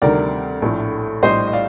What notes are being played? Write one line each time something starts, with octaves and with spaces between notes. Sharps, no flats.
D2 C3 D#3 G3 C4 A#4 D5
A#1 A2 A3
A#1 A2 G3 C5 D#5
D#5
D5 F5